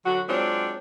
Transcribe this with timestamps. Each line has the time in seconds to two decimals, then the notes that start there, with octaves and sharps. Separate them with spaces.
0.05 D3 F#3 F#4
0.29 F#3 G#3 C4 D4 F4 C#5